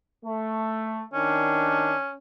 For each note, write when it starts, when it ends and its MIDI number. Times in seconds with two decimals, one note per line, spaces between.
0.24 1.02 57
1.14 1.94 51
1.14 2.16 61
1.14 1.94 62